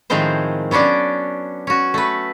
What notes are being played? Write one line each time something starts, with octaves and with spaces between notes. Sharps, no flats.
A2 D#3 F3 G#3 C4 C5
F#3 B3 C#4 D4 D5
C#4 F#4
A3 B4